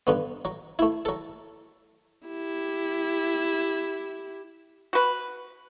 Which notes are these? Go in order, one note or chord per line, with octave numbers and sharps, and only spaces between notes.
G2 D3 B3
F#3
A3 E4
F#3 A4
E4 G4
F#4 B4